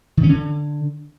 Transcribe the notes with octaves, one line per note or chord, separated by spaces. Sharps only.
D#3
C#4
D3